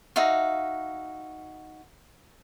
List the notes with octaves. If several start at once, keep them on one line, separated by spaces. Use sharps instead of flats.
D#4 F#4 E5 F5